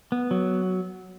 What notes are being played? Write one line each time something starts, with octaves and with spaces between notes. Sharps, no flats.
B3
F#3